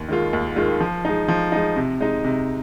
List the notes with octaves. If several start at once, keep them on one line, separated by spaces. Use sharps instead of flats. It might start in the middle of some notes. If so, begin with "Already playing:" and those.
Already playing: D#2
D#3 G#3 F4
D#2
D#3 G#3 F4
F3
G#3 D#4
F3
G#3 D#4
C3
G#3 D#4
C3